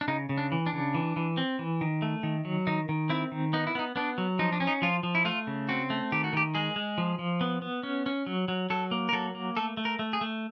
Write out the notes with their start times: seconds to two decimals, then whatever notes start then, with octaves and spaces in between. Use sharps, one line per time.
0.01 D4
0.08 C#3 D#4
0.29 C#3
0.38 D4
0.52 E3
0.66 D4
0.73 C#3
0.94 E3
1.16 E3
1.37 C4
1.59 E3
1.81 D#3
2.02 A3
2.23 D#3
2.45 F#3
2.67 D#3 D#4
2.89 D#3
3.09 C4 E4
3.32 D#3
3.53 B3 D#4
3.67 E4
3.75 B3 D#4
3.96 B3 D4
4.18 F#3
4.39 F3 D#4
4.52 D4
4.60 C#4
4.67 D#4
4.82 F3 F4
5.03 F3
5.15 E4
5.25 A3 F4
5.47 C#3
5.69 C4 F#4
5.90 A3
6.12 D#3 G4
6.24 F#4
6.33 D#3 G4
6.55 G#3 G#4
6.76 G#3
6.98 F3
7.19 F3
7.41 B3
7.62 B3
7.83 C#4
8.06 C#4
8.26 F#3
8.48 F#3
8.70 F#3 A4
8.91 A#3
9.09 A#4
9.13 F#3 A4
9.35 A#3
9.57 A3 A4
9.77 A3
9.85 A#4
9.99 A3
10.13 G#4
10.21 A3